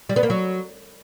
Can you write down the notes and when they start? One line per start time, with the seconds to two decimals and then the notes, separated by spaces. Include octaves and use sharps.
0.09 G3
0.16 B3
0.23 A#3
0.30 F#3